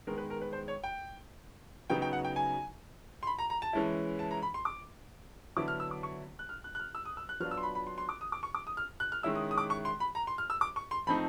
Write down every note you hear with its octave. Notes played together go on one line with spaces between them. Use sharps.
D#3 G#3 B3 A#4
B4
A#4
B4
C5
C#5
G5
C#3 F#3 B3 D#4 G5
G5
F#5
G5
G#5
C6
B5
A#5
A#5
A5
E3 G#3 C#4 E4
A5
A#5
B5
C6
D6
D3 F#3 B3 E4 D6
F6
E6
D6
C#6
F#6
F6
F#6
F#6
F6
E6
D#6
E6
F#6
F#3 B3 D4 F4 F6
E6
C6
B5
B5
C6
C6
D6
D#6
D6
C#6
D6
D#6
F6
F#6
F6
D#3 G#3 C#4 E4 E6
D#6
D#6
D6
C#6
C6
B5
A#5
C6
F6
E6
D6
C#6
C6
F3 A3 C4 D#4 B5